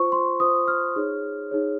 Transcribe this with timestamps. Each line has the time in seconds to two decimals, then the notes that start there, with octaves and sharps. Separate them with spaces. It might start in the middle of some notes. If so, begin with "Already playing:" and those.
Already playing: F4 C5 C#6
0.12 C6
0.40 F4 C5 D#6
0.68 F6
0.96 D#4 G#4 C#5
1.51 D#4 G#4 C#5